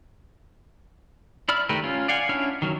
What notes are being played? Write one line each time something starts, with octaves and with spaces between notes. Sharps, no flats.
E4 D5 B5 F6
D#3 A3 G4 A#4 B4
C#4 F4
D5 F5 F#5 G#5
C#4 D4 E4 C#5 F6
D#3 F#3 B3 C#4